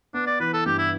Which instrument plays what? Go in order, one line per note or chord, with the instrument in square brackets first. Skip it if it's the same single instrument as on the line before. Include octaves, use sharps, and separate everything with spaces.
[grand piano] B3 [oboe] D4
[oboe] D5
[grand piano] E3 [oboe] B4
[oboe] A4
[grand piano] G2 [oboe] G4
[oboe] E4